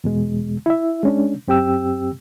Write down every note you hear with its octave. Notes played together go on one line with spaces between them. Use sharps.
E2 B2 G#3
E4 E5
G#3 C#4 D4
F#2 C4 G4 G5 E6